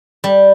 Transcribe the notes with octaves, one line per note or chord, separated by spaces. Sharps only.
G3